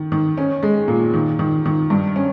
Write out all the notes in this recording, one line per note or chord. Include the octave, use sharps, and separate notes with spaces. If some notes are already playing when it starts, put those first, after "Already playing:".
Already playing: D#3
D#3
C#4
G#3
A#2
D#3
D#3
D#3
G2
C#4